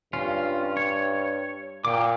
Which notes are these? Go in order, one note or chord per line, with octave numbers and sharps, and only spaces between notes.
G2 C#4 F4
C#5
A#2 G5 D6